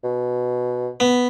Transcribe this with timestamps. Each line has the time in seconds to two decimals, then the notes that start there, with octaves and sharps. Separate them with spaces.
0.04 B2
1.00 B3